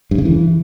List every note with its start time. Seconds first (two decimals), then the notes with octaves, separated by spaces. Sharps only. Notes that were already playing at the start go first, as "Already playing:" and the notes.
0.11 G2
0.18 C#3
0.25 E3